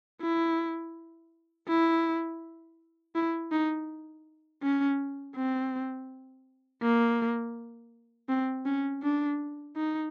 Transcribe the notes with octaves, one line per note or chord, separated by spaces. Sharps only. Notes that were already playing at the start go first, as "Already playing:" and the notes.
E4
E4
E4
D#4
C#4
C4
A#3
C4
C#4
D4
D#4